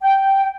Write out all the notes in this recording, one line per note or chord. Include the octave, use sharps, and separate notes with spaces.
G5